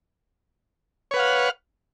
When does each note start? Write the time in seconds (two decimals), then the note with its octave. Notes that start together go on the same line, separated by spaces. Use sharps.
1.11 C#5
1.14 B4
1.16 F#5
1.19 F5